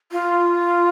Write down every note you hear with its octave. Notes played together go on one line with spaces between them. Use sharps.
F4